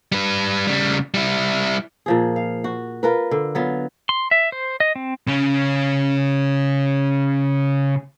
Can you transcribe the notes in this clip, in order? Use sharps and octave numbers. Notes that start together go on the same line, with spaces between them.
G3 B4
C#3 G3
G3 E4
A#2 F3 G#4
F5
F#4
F4 A#4 B4
D3
F#3 B3 F4
C6
E5
C5
D#5
C4
C#3 C#4